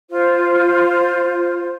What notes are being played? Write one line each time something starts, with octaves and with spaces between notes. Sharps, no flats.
F4 C5